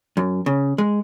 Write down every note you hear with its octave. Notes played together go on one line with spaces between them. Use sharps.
F#2
C#3
G#3